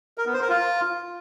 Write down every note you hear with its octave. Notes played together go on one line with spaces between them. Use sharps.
A#4
B3
C5
A#4
F4